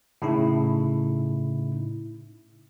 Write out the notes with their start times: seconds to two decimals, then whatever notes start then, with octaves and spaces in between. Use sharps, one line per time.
0.22 A2 C#3 D#4 E4